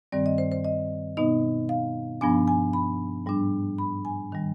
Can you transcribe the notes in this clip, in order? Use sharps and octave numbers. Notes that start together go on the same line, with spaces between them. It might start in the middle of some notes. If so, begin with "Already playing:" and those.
G2 D#3 G3 C4 D5
D#5
C5
C5
D#5
B2 B3 D#4 D#5
F5
G2 F3 B3 D4 G#5
G#5
B5
G#2 G3 D4
B5
G#5
D#3 G3